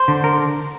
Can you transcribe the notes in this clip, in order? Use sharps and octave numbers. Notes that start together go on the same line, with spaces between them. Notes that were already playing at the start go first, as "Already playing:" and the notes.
Already playing: C5
D3
A#4